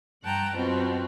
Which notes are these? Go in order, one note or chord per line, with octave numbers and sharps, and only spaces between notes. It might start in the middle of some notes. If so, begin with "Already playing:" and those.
G2 F#5 G5 A5 A#5
F#2 B2 C4 F4 F#4